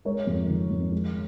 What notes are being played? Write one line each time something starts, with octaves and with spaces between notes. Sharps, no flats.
G#3 A#4 C#5
F2
D#3
F2
G#3